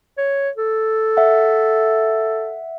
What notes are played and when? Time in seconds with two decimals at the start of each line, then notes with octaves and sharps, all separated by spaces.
0.18 C#5
0.57 A4
1.17 E5 F#5